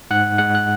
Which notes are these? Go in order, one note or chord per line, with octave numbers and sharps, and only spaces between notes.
G#2 F#5 F#6
G#3 F#5 F#6
F#6